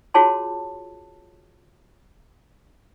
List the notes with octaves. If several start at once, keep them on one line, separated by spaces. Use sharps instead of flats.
F4 F#4 G#4 C#5 A5 C6